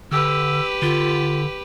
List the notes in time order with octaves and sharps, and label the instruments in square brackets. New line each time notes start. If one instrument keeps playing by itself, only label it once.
[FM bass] D3 [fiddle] G4 B4 [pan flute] E6
[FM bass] D3 [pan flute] F4